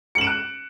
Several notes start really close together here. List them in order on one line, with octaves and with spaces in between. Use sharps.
C#7 F#7 E7 D7 F#6